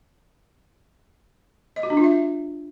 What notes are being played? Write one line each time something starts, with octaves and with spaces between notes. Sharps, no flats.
D#5
F#4
D4
F4
E5